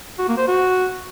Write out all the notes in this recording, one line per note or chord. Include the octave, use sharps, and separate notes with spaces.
F#4
A#3
C5
F#4